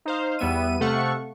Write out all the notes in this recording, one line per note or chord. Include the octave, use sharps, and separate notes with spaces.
D#4 C5 F5
E2 G3 B3 E5 D#7
C3 A3 A4 F5 F#5 C#6